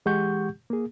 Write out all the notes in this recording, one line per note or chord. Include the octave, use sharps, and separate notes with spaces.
E3 G#3 G4 F#5 C#6 G6
A#3 G#4